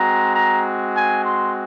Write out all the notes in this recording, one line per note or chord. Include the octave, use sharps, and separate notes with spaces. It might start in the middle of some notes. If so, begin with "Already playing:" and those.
Already playing: G#3 C4 F#4 A#5
A#5
G#5
C6